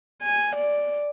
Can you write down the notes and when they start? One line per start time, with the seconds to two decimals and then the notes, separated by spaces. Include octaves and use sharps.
0.23 G#5
0.56 D5